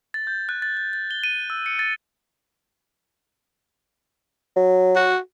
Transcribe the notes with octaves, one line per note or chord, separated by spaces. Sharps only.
A6
G6
F#6
A6
A6
A6
G7
D#7
E6
C#7
A6
F#3
F#4